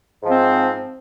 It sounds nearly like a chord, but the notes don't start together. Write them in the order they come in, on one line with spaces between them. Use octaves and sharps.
G#2 F3 C4